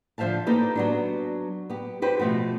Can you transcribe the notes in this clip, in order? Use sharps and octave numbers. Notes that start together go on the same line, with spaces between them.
D3 F3 C5 E5 F5 A5
A#3 D#4 G4 A4 B4
F#3 B3 D4
B3 G4
F#4 G4 B4 C5
B2 F3 A3 F#4